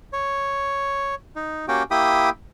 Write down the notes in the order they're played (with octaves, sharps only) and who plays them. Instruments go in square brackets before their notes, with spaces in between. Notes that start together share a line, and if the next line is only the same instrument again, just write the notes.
[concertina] C#5
D#4
A#3 C#4 F#4 G4 G5
A#3 E4 G4 G5 B5 D#6